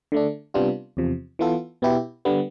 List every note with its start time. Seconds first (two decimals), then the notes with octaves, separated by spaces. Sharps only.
0.12 D3 A3 D4
0.54 C3 G3 B3 D4 F4
0.97 E2 C3 F3
1.39 E3 B3 F4 A4
1.82 B2 B3 E4 G4
2.25 D3 G3 B3